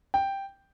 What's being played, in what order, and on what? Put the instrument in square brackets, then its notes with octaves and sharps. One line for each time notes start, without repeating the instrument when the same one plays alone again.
[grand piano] G5